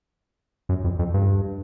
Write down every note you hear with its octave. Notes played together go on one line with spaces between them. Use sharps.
F#2
F2
F2
G2